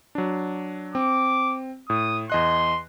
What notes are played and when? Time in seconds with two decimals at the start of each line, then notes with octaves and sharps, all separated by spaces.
0.15 F#3 D4
0.95 C4 D6
1.90 A2 D#6
2.30 E2 D#5 C6 F#6